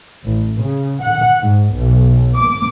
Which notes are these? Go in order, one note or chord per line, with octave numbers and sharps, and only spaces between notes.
A1
C#3
F#5
G#2
B1
D6